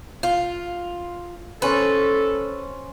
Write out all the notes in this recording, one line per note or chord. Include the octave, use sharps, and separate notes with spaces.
F4
C#4 A4 B4 C5